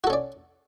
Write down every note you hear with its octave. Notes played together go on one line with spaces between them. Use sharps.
C#4 F#4 A4 D5